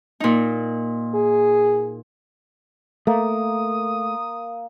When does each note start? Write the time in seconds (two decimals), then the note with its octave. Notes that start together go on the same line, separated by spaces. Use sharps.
0.20 A#2 D#4
1.15 G#4
3.07 A3 A#3 D#6